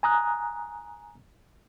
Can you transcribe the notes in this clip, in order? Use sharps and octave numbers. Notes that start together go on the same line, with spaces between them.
G#5 A#5 D#6 F#6